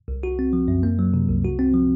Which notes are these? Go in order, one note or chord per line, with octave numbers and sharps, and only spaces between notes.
C2
F#4
C4
F3
F#2
A#3
F#3
C3
C2
F#4
C4
F3